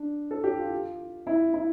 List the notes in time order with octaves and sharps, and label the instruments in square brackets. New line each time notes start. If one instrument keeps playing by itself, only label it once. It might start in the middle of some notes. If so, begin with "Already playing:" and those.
Already playing: [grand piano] D4
A4
G4
F4
E4
E4